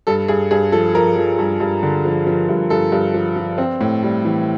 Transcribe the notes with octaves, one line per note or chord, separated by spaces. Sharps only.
G2 A4
G2 G#4
G2 G#4
F3 A4
F3 A#4
F3
G2
G2
D3
F3
F3
G2
G2 A4
G2
F3
F3
C4
A2
G3
E3